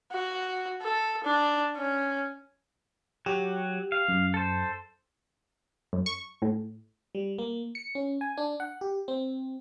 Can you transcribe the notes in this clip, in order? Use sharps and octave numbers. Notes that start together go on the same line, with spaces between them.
F#4
A4
D4
C#4
F#3 F#4 G4
F5
F#2
A4 C5
F#2
C#6
A2
G3
A#3
C#7
C#4
G#5
D4
F#5
G4
C4